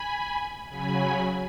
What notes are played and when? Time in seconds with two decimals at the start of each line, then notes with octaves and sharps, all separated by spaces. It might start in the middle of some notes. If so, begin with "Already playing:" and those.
Already playing: G#5 B5
0.69 C#3 F#3 G#5 B5